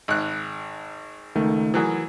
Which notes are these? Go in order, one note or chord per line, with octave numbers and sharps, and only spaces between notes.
G#1 F#6
C#2 D#3 A3
E3 F#3 G#4 A#4 B4